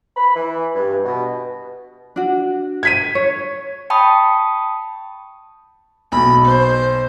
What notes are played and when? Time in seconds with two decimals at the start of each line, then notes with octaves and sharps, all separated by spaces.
0.16 B5
0.35 E3
0.75 G2
1.05 B2
2.16 D4 F#4
2.83 G#6 B6 D#7
3.15 C#5
3.90 G5 A5 B5 C#6 D#6
6.12 B1 B2 B5
6.45 C5